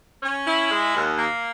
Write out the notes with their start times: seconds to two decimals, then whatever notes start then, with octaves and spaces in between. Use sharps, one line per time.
0.23 C#4
0.46 E4
0.70 G#3
0.95 D#2
1.17 A#3